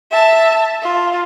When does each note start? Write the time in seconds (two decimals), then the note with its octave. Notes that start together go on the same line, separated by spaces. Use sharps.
0.11 E5 A5
0.82 F4